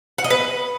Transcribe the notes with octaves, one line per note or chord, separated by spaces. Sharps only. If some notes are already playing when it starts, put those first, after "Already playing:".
F#5
D#5
B4